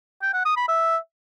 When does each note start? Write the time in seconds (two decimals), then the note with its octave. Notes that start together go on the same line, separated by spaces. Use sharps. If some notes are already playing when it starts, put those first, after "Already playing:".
0.22 G5
0.33 F#5
0.45 D#6
0.56 B5
0.68 E5